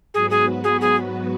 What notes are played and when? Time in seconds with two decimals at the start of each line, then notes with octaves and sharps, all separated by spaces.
0.14 G#2 F#3 B3 F#4 G#4 B4
0.30 G#4
0.64 G#4
0.81 G#4